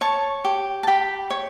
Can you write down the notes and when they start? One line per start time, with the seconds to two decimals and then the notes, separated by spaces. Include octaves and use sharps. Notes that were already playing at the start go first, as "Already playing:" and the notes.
0.01 C#5 A5 C#6
0.44 G4
0.83 A5
0.87 G4 G5 B5
1.30 C#5